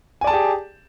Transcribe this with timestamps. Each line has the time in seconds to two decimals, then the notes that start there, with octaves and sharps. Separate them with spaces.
0.21 G#5
0.24 D5
0.27 A5
0.30 G#4
0.33 G4